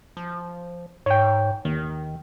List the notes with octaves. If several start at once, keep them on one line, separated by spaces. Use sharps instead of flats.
F3
G#2 C#5 G5
D#2 D#3